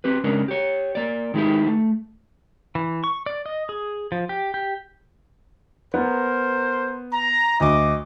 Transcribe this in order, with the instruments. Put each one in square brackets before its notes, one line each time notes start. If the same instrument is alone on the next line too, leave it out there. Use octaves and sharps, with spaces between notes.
[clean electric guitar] C4 G4 B4
C#3 G#3 C#4 D4 A#4
G4 C#5
A#3 D5
D#3 G#3 D#4 E4 G4
A3
[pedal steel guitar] E3
C#6
D5
D#5
G#4
F3
G4
G4
[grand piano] B3 [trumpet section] A#4 C5
[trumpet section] A#5
[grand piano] D2 [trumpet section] D#5 D6